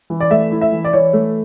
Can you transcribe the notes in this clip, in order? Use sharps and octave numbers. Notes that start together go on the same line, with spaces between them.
E3
D5
A3 E5
E4
E5
E3
D5
E3 C#5
A3